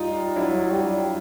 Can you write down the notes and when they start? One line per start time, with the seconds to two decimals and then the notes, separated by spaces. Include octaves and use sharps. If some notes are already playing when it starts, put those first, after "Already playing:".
Already playing: G3 D#4 F4
0.36 F#3 D4 E4
0.71 G3